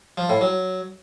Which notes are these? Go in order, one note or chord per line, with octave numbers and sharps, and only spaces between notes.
F3
A2
F#3